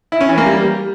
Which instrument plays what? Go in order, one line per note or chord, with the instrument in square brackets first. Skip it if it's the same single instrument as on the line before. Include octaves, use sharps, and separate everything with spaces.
[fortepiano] E4
C#4
E3
A#3
G3